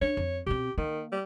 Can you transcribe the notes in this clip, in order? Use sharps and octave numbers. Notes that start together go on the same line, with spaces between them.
D4 C#5
F2
B2 C4 G4
D#3 A#3
G3